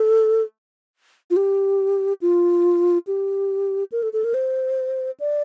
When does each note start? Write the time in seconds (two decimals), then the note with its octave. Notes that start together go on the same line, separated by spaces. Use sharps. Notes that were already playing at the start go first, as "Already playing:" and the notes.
Already playing: A4
1.30 F4
1.36 G4
2.21 F4
3.07 G4
3.92 A#4
4.03 A4
4.13 A4
4.24 A#4
4.34 C5
5.20 D5